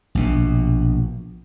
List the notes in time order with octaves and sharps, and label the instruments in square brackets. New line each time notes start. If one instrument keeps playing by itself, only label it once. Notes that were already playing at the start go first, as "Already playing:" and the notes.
[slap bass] A#1 B2